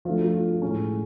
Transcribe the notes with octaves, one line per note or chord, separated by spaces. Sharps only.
F3 A3 D4 F4
F#4
F4
A2 G#3 C#4